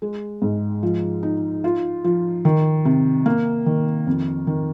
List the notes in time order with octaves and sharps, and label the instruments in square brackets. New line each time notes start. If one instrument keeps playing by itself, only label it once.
[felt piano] G#3
G#2
F3
D#4
F4
F3
D#3
C3
A#3
D#3
F2
D#3